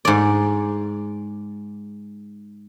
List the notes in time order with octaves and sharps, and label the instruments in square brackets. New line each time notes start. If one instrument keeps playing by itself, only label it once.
[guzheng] G#2 D5